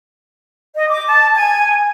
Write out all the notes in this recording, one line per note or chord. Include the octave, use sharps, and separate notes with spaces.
D#5
D6
A5
G#5